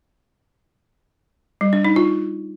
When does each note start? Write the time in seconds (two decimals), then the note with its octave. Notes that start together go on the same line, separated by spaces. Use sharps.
1.61 G3
1.73 D4
1.85 D#4
1.96 F4